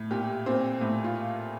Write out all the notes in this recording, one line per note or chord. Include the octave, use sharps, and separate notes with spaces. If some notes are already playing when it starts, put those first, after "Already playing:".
Already playing: A2
A#2 G4
A#2 C4
A2
F4